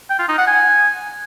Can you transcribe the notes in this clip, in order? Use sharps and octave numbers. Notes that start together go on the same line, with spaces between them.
G5
F4
D#4
F#5
G#5